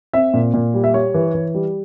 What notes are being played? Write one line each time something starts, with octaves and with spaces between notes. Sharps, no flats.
C4 E5
A#2
A#2
G3
E5
G3 C#5
E3
E3
G3